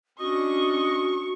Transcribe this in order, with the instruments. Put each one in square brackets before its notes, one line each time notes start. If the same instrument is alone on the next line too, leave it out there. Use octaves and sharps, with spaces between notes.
[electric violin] C#4 D4 [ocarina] F#4 [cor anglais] D#5 [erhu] C#6